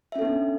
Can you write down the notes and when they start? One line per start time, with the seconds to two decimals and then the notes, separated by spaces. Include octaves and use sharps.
0.12 E5
0.16 C#4
0.19 A4
0.22 B3
0.25 D4